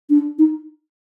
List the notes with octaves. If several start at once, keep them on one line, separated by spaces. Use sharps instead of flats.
D4
D#4